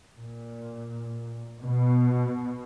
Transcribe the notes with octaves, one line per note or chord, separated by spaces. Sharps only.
A#2
B2